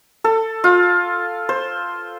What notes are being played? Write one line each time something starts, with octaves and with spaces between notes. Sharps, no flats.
A4
F4
C5